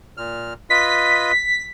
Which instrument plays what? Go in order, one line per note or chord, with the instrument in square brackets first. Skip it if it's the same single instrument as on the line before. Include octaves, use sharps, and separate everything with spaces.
[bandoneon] A#2 F6
[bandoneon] F4 B4 D#5 [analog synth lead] B6